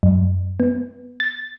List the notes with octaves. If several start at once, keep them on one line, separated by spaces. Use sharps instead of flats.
F#2
B3
A6